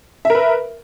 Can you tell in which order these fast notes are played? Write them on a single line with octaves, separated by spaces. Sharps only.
E5 A#4 B4